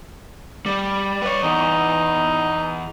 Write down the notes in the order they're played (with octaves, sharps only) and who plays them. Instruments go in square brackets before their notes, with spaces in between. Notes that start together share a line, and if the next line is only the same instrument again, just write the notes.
[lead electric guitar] G3 [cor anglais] D5
[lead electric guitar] B4 C#5
[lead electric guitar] E2 [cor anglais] D#4